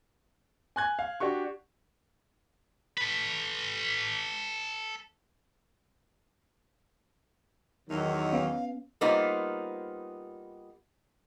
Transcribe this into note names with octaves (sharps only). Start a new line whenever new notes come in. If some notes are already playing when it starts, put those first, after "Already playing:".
G#5 F#6 G#6
F5
D4 F#4 G4 C#6
A4 B4
E2 D#3 F#3 D#4
B3 C#4 F5
G3 A#3 B3 D#4 F4 C5